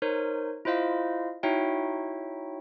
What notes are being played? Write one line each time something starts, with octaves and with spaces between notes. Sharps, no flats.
D#4 A#4 C5 C#5
E4 F4 C5 D#5 F5
D#4 E4 F#4 C#5 E5 G5